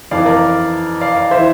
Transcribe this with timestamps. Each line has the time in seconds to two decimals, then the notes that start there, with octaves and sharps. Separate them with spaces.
0.11 F2 E3 D5 F5
0.26 A#4 D5
1.01 D5 F5
1.16 D5 F5
1.31 E3 C5 E5